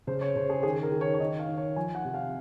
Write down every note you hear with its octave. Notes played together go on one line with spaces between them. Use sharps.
C#3 C5
C#5
C#3 C5
G#4
D#3 G#4
A#4
D#3
C#5
C#5
D#3 D#5
F5
D#3
C#5
F3 G#5
F#5
C3
F5